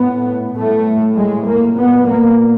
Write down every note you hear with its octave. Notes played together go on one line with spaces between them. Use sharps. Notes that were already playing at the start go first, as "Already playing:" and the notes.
Already playing: A2 B3
A2 A3
G#3
A#3
A#2 B3
A#3